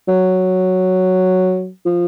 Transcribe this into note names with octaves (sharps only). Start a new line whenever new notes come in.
F#3
F3